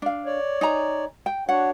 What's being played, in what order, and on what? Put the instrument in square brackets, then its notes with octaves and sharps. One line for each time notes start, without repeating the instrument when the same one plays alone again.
[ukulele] D4 F5
[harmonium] C#5 D5
[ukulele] D#4 G#5 A#5
G5
[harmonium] D4 F#4 C#5 [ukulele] F#5